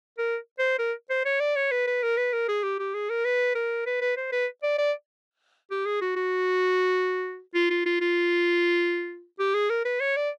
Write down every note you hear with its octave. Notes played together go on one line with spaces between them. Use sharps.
A#4
C5
A#4
C5
C#5
D5
C#5
B4
B4
A#4
B4
A#4
G#4
G4
G4
G#4
A#4
B4
A#4
B4
B4
C5
B4
D5
D5
G4
G#4
F#4
F#4
F4
F4
F4
F4
G4
G#4
A#4
B4
C#5
D5